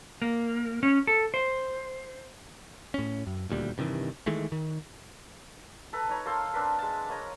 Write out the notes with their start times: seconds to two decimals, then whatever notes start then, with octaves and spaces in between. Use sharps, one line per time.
0.22 A#3
0.83 C#4
1.07 A4
1.34 C5
2.94 A2 C#4
3.27 F#2
3.49 D#1 D2 A#2 G3
3.78 G2 C3 D#3 E3
4.26 D#3 E3 G#3 A3
4.52 D#3
5.93 A4 B4 A#5 B5
6.09 D#4 C#5 A#5
6.25 A#3 A4 C5 F5
6.54 C4 D4 A#4 B4
6.79 G#3 A5
7.09 A#3 C#5 D#5 A#5